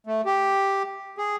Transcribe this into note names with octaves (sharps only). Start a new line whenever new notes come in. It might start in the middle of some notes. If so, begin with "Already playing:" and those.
A3
G4
G#4